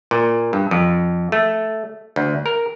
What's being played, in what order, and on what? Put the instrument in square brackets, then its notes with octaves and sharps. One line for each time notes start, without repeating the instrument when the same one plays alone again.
[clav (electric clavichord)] A#2
G2
F2
A3
D2
A#4